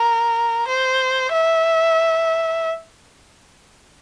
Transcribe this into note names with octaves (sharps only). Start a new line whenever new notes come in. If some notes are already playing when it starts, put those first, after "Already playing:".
Already playing: A#4
C5
E5